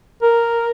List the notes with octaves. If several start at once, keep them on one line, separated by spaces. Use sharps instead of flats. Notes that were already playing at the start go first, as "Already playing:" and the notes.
A#4